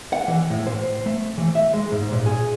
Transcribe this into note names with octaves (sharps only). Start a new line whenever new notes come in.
F#5
E3
A2
C5
A3
E3
E5
G#3
G#2
A#2
G#4